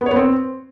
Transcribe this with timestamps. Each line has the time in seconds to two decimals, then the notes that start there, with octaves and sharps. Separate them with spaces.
0.01 B3
0.06 C#5
0.11 B3
0.16 C4